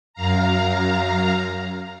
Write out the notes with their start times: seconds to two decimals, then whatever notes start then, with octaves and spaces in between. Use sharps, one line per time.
0.14 F#2 F5 A#5